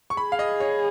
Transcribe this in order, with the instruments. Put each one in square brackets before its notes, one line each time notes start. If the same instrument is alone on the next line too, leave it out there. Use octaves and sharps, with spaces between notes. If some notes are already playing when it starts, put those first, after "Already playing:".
[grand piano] C#6
[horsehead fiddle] G#4 [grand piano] B5
[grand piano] F5
D#5
C#5